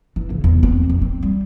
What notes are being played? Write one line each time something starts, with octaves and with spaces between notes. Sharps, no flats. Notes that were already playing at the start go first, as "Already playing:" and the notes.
E3
C#3
E2
C4
F2
C4
G3